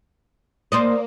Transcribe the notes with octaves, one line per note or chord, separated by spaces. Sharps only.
A#3 C5 D5 D#5